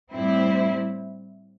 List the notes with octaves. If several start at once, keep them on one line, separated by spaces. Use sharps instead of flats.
A2 G3 C4 E4